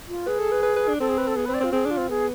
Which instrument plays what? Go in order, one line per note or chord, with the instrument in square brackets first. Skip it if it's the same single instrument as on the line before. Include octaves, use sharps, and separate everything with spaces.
[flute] F4
[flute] G#4 [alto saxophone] B4
[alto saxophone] A4
B4
B4
B4
D4
[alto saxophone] C4 [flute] A4
[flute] G#4
B4
A4
[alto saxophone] B3 [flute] G#4
[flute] B4
[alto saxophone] C4
[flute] D5
[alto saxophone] C4
[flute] F4
[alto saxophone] C4 [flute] G#4
[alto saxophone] D4
[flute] F4
[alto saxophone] C4
[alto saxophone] B3 [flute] G#4